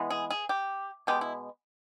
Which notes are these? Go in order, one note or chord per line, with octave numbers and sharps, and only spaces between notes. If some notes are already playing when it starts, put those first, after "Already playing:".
Already playing: E3 G#3 B3
G#4
G#4
G4
B2 G#3 B3 G4
E4